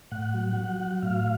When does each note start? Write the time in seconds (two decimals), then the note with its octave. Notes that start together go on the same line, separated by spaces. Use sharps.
0.11 A2 F#5
0.34 F#3
0.57 F#3
0.80 F#3
1.02 A2 F5